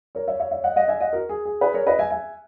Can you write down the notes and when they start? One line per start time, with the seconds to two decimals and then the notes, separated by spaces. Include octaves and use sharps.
0.15 A#4 C#5
0.28 C#5 E5
0.40 C#5 E5
0.51 C#5 E5
0.64 D#5 F#5
0.76 D#5 F#5
0.88 E5 G#5
1.00 D#5 F#5
1.13 F#4 A#4
1.29 G#4
1.45 G#4
1.61 G#4 B4
1.74 A#4 C#5
1.86 B4 D#5
1.99 E5 G#5
2.10 E5 G#5